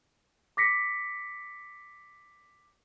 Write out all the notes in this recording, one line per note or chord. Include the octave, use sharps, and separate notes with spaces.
D6 A#6 B6 C#7